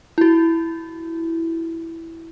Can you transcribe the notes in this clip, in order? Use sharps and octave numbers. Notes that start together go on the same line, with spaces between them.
E4 F#4